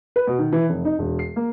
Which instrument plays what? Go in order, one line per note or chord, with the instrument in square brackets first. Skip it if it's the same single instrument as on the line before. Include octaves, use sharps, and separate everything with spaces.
[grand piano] B4
B2
D#3
E3
F1
D#4
E1
C7
A#3